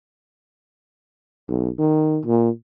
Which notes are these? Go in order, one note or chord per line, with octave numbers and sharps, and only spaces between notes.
B1
D#3
A#2